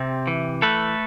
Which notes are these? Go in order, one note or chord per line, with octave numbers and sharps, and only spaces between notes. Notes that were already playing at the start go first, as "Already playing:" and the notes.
Already playing: C3 C4 G4
E3
A3 A4 B4